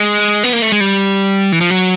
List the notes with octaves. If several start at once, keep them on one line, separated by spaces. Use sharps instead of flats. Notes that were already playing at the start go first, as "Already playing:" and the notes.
Already playing: G#3
B3
A#3
A3
G#3
G3
E3
F3
F#3